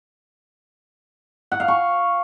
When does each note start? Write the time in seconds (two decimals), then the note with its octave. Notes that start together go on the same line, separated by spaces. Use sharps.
1.52 F#5
1.60 F5
1.68 C#6